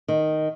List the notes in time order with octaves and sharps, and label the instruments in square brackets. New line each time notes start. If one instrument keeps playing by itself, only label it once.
[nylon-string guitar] D#3